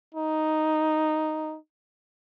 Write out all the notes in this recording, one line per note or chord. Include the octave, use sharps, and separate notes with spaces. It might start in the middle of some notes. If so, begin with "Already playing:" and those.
D#4